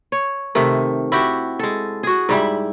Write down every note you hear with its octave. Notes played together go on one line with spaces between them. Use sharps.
C#5
C3 D#3 A3
E4 F#4 G4
G#3 A4
F#4 G#4
G#2 G3 E4